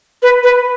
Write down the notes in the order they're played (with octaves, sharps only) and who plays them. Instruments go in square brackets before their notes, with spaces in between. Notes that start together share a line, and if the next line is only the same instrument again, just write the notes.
[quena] B4
B4